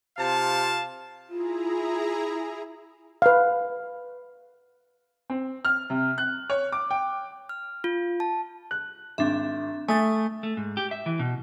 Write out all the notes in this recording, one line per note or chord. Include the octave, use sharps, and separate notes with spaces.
C3 F4 F5 A5
E4 F4 G#4 A#5
B4 F5
C4
F6
C3
F#6
C#5
D6
G5
F6
F4
A5
F#6
G#1 C4 D4 E5
A3 G#5 D#6 A6
A3
G#2
G4
E5
E3
B2